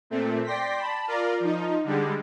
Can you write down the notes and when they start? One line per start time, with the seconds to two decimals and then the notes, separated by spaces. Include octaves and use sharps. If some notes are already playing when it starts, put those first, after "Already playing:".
0.10 A#2 A3 C4
0.44 D5 G5 C6 A#6 B6
0.79 A5 B5
1.07 F4 A#4 D5
1.40 F3 D#4
1.84 D3 G3 G#3